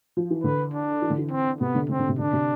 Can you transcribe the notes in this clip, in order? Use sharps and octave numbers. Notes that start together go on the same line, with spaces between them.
F3
E3
D3 B4
D4
E3
D3
E3
C4
C3 B3
D3
D3 C4
D3
C3
D3 D4
C3